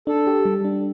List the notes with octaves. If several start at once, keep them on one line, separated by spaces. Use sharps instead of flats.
D4 A4
G4
G3
D4